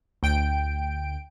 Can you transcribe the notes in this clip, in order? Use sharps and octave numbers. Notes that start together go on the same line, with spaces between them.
D2 G5 D7